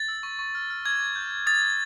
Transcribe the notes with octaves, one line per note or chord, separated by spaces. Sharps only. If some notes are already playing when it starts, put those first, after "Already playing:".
Already playing: A6
E6
C#6
C#6
F6
F6
D6 G#6
D6
G6
G6
D#6 A6
D#6